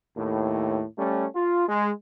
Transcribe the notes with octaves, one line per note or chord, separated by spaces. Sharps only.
D#2 A2
G3 A3 C#4
F4
G#3